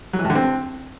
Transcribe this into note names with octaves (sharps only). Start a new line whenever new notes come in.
F#3
E3
A2
D3
C4